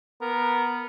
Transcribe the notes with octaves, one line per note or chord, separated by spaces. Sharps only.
B3 A#4